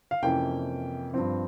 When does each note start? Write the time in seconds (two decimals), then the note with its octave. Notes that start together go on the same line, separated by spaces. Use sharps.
0.11 F5
0.23 F2 C3 E3 A#3 C#4 G5
1.14 G2 F3 C4